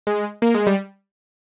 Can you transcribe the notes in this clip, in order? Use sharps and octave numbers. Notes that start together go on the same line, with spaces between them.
G#3
A#3
G#3
G3